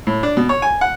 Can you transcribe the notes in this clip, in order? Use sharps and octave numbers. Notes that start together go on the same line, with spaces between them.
A2
D4
B2
C#5
G#5
F#5